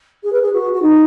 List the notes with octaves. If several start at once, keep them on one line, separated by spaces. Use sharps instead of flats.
G#4
B4
G#4
F#4
F#4
D#4